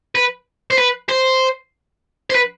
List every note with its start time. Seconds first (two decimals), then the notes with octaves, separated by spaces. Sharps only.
0.15 B4
0.71 C5
0.78 B4
1.09 C5
2.30 C5
2.35 B4